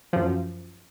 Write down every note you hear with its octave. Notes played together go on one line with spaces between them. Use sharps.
F#2 F3